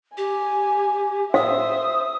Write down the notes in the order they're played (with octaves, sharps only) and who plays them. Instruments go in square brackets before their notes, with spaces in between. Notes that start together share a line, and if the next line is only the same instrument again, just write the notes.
[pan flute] G4 [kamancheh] G#5
[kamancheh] C5 E5 [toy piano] F5 [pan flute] D#6